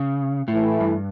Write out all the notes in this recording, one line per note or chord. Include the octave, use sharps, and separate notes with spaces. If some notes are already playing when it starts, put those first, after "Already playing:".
Already playing: C#3
A2 E3 A3 E4
G2